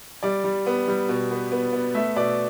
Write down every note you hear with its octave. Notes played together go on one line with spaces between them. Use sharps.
G3 D5
G3
B3
G3
B2
B3
B3
B3
A3 E5
B2 D5